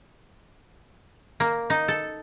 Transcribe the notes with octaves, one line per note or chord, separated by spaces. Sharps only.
A#3
D#4
A4